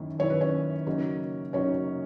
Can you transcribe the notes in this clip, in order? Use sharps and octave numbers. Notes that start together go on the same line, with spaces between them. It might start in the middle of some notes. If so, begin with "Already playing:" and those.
Already playing: F#2 D#3 A#3 C#4 E4
F#2 D#3 A#3 C#4 E4 C#5
B4
C#4 C#5
F#2 C#3 F#3 A#3 D#4
F#2 C#3 F#3 A#3 C#4 D#4 C#5